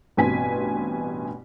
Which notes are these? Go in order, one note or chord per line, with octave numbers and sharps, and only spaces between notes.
A1 G2 B2 C4 G#5 B6